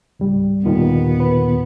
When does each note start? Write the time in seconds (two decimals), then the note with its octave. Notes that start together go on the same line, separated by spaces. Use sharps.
0.20 C#2 G#2 G3
0.65 D#2 A#2 D#3 B3
1.20 B4